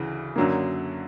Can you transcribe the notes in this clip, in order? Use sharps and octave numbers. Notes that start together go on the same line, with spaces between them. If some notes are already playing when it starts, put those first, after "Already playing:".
Already playing: D2 C#3 E3
F#2 D3 F#3 A#3